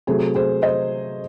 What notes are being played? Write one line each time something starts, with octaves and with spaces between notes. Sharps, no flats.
C3 F#3 A3 G#4
G#4 C5
C5 D#5